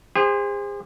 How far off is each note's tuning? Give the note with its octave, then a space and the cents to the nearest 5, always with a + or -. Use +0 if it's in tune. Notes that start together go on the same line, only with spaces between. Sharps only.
G#4 -40 C5 +0